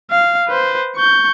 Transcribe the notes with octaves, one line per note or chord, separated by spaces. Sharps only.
F5
B4 C5
C#6 G6